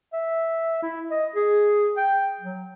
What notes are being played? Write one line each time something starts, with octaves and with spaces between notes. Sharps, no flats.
E5
E4
D#5
G#4
G5
F#3